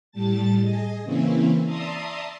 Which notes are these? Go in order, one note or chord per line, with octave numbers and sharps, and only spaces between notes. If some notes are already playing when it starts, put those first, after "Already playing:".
A2 G3 A5 A6
G#4 D#5
C#3 E3 A#3 C4 C#4 E4
D5 E5 A5 A#5 C6 D#6